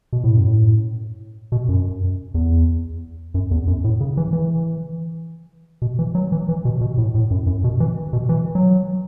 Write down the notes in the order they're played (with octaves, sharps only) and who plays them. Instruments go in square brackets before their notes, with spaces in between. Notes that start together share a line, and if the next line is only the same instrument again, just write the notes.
[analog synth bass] B2
A2
F#2
A2
B2
F#2
E2
F#2
E2
F#2
A2
C#3
E3
E3
B2
E3
F#3
E3
E3
B2
B2
A2
A2
F#2
F#2
B2
E3
B2
E3
F#3